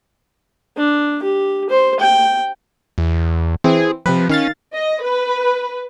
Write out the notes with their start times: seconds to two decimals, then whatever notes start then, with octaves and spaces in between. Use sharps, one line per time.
0.77 D4
1.23 G4
1.70 C5
2.00 G5
2.98 E2
3.64 E3 C4 G#4
4.06 C3 F3 C4 B4
4.29 D#3 C#4 F5 A6
4.74 D#5
5.03 B4